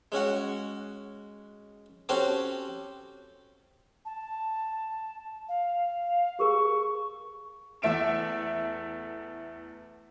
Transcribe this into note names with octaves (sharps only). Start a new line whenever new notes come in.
G#3 C#4 F#4 F#5
C4 C#4 F#4 G4 A4 C5
A5
F5
G4 G#4 A#4 C#6
E2 A3 E5 D7 E7